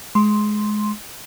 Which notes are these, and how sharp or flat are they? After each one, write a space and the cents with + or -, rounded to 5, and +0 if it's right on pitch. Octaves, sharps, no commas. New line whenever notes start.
G#3 +20 C6 +0